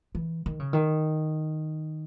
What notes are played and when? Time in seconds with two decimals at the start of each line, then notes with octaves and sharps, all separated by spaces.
0.15 E3
0.46 D#3
0.60 C#3
0.73 D#3